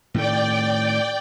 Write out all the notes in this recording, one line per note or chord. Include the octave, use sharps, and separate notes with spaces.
A2 D#3 A3 D5 G5